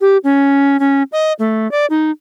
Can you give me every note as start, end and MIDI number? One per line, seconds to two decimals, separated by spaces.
0.01 0.17 67
0.24 0.80 61
0.80 1.03 61
1.12 1.33 75
1.39 1.70 57
1.71 1.86 74
1.90 2.11 63